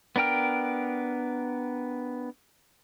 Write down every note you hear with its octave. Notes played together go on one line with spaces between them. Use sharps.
B3 D4 A#4 G5 F6